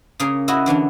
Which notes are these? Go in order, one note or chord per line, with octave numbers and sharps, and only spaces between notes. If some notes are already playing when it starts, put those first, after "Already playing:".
C#3 A#3 C#4 G#4
E4 F#4 D#5
D3 E3 C#4 D4